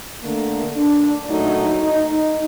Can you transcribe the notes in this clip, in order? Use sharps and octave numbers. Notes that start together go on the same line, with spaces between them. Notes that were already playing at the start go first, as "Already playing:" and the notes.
D3 A3 A#3
D4
A#2 F#3 A3 D#4
D#4